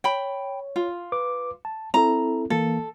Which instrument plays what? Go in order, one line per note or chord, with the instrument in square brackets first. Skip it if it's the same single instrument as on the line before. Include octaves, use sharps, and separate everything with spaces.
[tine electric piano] C#5 [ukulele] G5 B5
[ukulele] F4
[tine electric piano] B4 D6
A5
[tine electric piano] C4 E4 A4 [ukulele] A#5
[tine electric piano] E3 A#3 [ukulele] A4